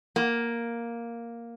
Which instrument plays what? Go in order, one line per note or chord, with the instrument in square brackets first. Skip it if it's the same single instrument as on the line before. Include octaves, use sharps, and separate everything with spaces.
[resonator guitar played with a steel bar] A#3